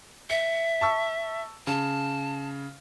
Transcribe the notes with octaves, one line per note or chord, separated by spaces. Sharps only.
E5 C#7
A5 C#6 E6
C#3 A5